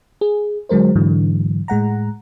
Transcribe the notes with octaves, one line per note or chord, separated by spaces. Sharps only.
G#4
D3 F#3 G#3 A#4 C5
G#2 D3 E3 F#3
A2 G#3 F#5 A#5